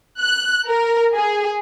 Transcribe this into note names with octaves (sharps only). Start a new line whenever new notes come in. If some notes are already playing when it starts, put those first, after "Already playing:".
F#6
A#4
G#4